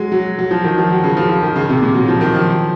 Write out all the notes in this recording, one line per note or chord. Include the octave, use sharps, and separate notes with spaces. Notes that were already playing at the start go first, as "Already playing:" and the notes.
Already playing: F#3 G#3
F#3
F#3
F3
D#3
F3
F#3
C#3
F3
F3
D#3
C#3
C3
A#2
F#3
F3
D#3
F3